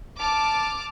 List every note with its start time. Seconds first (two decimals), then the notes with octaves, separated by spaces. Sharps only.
0.19 A5 D6 F6